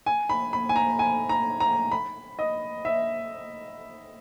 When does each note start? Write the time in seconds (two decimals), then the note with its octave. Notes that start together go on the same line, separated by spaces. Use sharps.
0.06 G#5
0.29 B5
0.53 B5
0.69 G#5
0.76 A#5
0.99 G#5
1.29 A#5
1.60 A#5
1.92 B5
2.39 D#5
2.85 E5